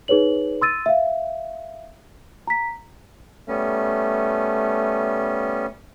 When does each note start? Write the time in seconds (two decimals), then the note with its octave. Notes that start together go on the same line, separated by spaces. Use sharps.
0.08 D#4 G#4 B4 C#5 F#7
0.62 C6 E6 A6 D#7
0.86 E5 F5
2.47 A#5 B6
3.48 G3 A3 B3 C#4